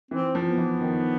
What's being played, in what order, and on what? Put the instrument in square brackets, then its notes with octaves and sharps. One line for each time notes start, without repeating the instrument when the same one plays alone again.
[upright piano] E3 [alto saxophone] C4
[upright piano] F3
[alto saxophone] B3
[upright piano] E3
D#3